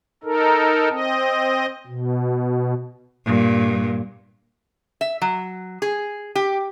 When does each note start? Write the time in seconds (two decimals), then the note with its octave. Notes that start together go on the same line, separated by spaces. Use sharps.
0.24 D#4 A4 A#4
0.90 C4 D#5
1.87 B2
3.25 G2 A#2
5.01 E5
5.22 F#3
5.82 G#4
6.35 G4